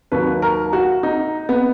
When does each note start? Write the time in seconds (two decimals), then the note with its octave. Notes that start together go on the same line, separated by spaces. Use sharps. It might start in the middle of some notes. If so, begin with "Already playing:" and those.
0.12 D#2 D#3 F#3 B4
0.42 A#4
0.73 F#4
1.03 D#4
1.49 B3